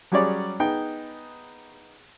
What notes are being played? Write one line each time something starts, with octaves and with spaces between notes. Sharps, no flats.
F#3 G3 C#4 G#4 C#5 D5
B3 D#4 G#4 G5